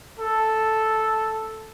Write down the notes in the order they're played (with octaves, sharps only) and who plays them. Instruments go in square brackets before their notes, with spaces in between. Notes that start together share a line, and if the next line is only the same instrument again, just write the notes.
[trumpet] A4